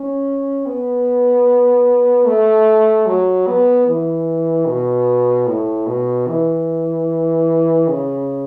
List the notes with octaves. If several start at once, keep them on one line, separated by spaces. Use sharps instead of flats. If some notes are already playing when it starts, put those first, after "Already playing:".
Already playing: C#4
B3
A3
F#3
B3
E3
B2
A2
B2
E3
C#3